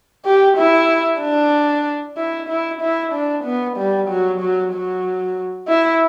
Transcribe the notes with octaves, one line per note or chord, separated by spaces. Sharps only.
G4
E4
D4
E4
E4
E4
D4
B3
G3
F#3
F#3
F#3
E4